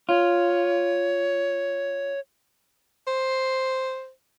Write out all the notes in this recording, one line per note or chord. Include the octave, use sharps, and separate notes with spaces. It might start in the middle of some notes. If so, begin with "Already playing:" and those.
F4 C#5
C5